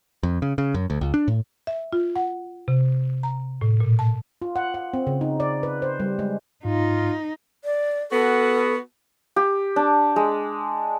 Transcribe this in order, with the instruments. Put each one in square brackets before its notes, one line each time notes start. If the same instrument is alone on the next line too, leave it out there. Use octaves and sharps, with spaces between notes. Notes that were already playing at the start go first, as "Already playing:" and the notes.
[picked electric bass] F2
C#3
C#3
F#2
D2
C#2
D4
A2
[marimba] E5
F4
F#5
C3
A#5
A2
A#2
A5
[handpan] F4
F#5
F#5
C4
C#3
D#4
D5
B4
C5
G3
G#3
[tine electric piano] G#2 [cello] D#4 [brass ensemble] F4
[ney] D5
[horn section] B3 F#4 [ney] A4
[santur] G4
D4
G#3